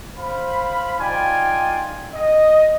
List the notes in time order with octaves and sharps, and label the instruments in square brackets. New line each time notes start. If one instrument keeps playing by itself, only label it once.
[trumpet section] C5 F5 B5
D#4 F4 D5 G5 G#5
D#5